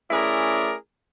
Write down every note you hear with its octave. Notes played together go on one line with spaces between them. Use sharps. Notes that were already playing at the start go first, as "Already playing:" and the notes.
A3 C#4 E4 G#4 A#4 D5